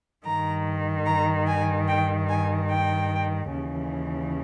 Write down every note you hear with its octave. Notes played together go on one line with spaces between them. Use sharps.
G2 D#3 A#5
A#5
G#5
G5
G#5
G5
D#2 C#3 E3